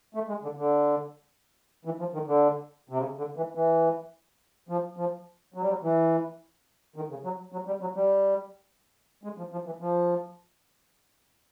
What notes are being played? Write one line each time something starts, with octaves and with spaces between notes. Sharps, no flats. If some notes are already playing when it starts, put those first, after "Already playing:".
A3
G#3
D3
D3
E3
F3
D#3
D3
C3
C#3
D3
E3
E3
F3
F3
F#3
G3
F#3
E3
D#3
C#3
F#3
F#3
G3
F#3
G3
G#3
F3
F3
E3
F3